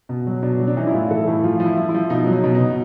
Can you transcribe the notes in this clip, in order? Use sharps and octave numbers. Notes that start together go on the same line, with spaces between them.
B2
F#3
B2 D4
F#3
D4
E3 D#4
E4
A2 F4
E3 A4
A2 E4
F3 F4
F3
E4
F3
E4
F3
B2 D#4
F#3
D#4
B2
D#4
B2